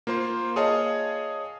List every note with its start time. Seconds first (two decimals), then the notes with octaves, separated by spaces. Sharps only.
0.07 A#3 F4 C5 C6
0.56 G#4 C#5 D#5 F5 A5